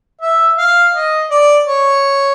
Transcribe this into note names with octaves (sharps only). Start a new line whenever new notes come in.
E5
F5
D#5
D5
C#5